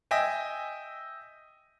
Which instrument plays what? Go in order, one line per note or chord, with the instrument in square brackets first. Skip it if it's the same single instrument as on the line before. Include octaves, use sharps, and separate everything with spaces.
[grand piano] D#5 E5 G5 G#5